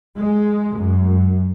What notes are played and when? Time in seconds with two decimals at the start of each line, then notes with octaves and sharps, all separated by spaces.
0.18 G#3
0.77 F#2